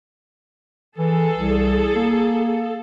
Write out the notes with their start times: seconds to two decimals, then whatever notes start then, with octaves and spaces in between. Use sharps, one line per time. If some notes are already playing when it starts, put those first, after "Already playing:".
0.98 E3 G#4 A4
1.34 C2
1.96 A#3